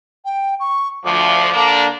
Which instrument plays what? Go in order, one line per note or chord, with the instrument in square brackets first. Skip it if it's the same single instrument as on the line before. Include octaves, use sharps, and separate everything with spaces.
[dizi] G5
C#6
[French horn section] D2 F3 [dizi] D6
[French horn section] D3 A#3 D4